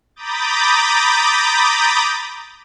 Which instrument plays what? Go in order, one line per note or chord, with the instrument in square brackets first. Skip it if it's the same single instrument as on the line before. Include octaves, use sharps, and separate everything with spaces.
[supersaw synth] A#5 B5 D6 D#6 G6 A6